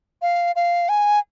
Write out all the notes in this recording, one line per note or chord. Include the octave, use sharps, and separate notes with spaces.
F5
F5
G#5